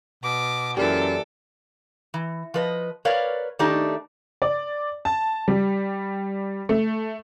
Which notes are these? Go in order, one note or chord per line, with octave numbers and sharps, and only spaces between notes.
B2 D6
F#2 E3 A#3 G4 A4 D5
E3
F3 B4 D#5
A#4 B4 C#5 D5 F5
D#3 A3 D4 D#4 G4
D5
A5
G3
A3